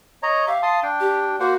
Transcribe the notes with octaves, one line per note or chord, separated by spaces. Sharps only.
C#5 D#5 A#5
G4 E5 F5
A5 C6 D#6
D4 G5
G4
A#3 F#4 C5 F#5